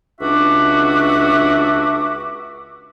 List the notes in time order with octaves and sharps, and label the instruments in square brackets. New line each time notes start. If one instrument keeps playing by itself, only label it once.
[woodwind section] C#2 D4 F#4 E5 D6